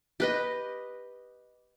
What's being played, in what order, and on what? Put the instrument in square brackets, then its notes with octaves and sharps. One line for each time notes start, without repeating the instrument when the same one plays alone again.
[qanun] G4 B4 D#5